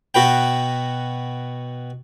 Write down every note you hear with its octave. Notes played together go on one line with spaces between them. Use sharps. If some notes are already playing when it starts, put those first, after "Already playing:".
B2 F#4 B4 G5